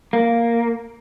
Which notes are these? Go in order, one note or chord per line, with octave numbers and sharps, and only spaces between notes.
A#3